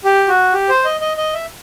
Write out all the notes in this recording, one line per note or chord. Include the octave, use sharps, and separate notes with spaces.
G4
F#4
G4
C5
D#5
D#5
D#5
E5